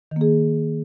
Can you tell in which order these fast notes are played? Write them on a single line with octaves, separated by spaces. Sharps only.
D#3 A#3 G#4